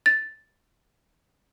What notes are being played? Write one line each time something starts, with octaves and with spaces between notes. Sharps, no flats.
A6